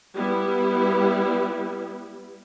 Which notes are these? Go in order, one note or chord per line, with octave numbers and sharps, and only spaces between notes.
G3 B3 E4